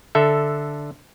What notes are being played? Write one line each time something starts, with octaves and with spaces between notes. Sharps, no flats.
D3 A4 E5